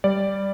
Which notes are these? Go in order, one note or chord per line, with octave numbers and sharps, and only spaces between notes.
G3 D5